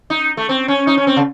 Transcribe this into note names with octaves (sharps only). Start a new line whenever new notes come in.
D#4
A3
C4
C#4
D#4
C#4
C4
C#3